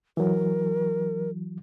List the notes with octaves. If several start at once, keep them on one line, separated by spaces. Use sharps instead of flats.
E3 F#3 A#4